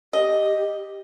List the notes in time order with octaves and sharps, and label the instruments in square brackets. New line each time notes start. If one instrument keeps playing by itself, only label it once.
[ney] G4 [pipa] D#5